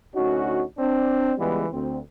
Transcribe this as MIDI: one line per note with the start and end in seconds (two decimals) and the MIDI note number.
0.14 0.62 38
0.14 0.62 61
0.14 0.62 63
0.14 0.62 66
0.78 1.31 60
0.78 1.31 62
1.38 1.66 37
1.38 1.66 52
1.38 1.66 55
1.38 1.66 56
1.38 1.66 59
1.72 1.98 38
1.72 1.98 60